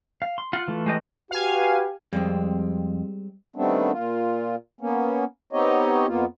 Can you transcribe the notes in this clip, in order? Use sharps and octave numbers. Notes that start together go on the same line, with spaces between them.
F5
C6
F4 F#5
E3 A3
G#3 G4 D#5
F#4 G4 B4 F5 G#5
F2 G3 G#3 C4
D#3 G3 A3 B3 C4 D4
A#2 F4
A#3 B3 C#4
B3 C4 D#4 G4 C#5 D#5
F2 A#3 B3 F4